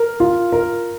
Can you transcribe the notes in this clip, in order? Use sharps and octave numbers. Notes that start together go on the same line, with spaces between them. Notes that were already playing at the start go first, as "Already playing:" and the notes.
Already playing: A#4
F4
A#4